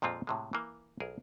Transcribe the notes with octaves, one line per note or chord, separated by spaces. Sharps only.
F2 A#2 G#3 C4 F4
A2 C3 G#3
E3 A#3
B1 G#4 A#4